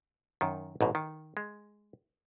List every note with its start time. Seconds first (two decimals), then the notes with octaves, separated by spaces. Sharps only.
0.41 F#2 D#3
0.81 A1 G#2 B2
0.95 D#3
1.37 G#3